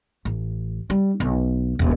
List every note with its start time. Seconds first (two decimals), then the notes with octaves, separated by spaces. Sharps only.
0.25 A1
0.90 G3
1.20 B1
1.79 D#1 A1